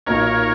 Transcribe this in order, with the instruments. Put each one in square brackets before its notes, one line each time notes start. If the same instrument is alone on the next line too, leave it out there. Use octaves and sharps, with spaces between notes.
[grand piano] B1 A#2 F#3 A#3 D#4 [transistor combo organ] A#4 C#5